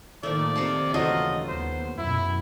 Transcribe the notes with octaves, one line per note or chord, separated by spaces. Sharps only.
A2 D#3 F3 A3 A#3 D5
C3 F5 A5
D#2 C#3 E3 F#3 A3 F4 D#5
D#2 B3 C5
F#2 B2 E4